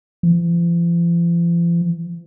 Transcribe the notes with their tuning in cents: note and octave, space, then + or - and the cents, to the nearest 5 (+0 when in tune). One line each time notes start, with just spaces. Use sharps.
F3 -45